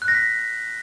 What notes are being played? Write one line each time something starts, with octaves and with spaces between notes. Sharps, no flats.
F#6
A#6
B6